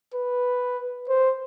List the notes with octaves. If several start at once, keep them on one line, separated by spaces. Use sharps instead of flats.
B4
C5